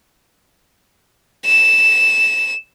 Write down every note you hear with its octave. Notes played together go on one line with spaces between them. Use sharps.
E7